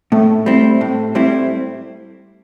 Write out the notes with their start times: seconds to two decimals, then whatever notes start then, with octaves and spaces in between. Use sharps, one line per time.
0.12 A2 A3
0.46 G3 C4 E4
0.81 A2
1.15 G3 C4 E4